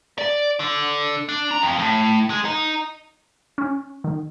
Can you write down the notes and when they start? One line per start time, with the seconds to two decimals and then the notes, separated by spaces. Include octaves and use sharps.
0.18 D5
0.60 D3
1.29 D4
1.51 A#5
1.62 F2
1.79 A2
2.30 G#3
2.45 D#4
3.58 C#4
4.04 D#3